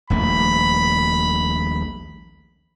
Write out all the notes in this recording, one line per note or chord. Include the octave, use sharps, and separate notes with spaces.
D#1 A#1 A3 B5